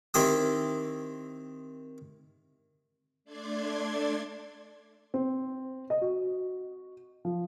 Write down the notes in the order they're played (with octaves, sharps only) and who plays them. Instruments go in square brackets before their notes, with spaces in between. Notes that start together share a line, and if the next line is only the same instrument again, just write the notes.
[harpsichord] D#3 C4 E4 G4 D6 D#6
[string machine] A3 D4 D5 C6 D6 G#6
[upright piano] C4
D#5
F#4
F3